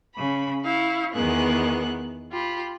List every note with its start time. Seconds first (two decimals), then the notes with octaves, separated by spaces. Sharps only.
0.15 C#3 B5
0.64 E4 F5 C#6
1.13 E2 D#3 B3 G#4 F#6
2.31 F4 G4 B5